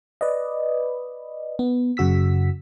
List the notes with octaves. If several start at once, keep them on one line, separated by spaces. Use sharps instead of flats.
B4 D5 D#5
B3
F#2 C#3 F#4 E6 B6